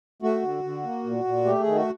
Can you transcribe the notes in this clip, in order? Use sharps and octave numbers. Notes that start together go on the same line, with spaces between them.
A3 F#4
D3
D3
A#3
A#2
A#2
A3 G4
G#4
D#3
F#4